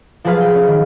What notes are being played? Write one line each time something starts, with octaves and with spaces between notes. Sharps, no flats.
F3 F#3 G#4 B4 F5
G5
C#4
D#3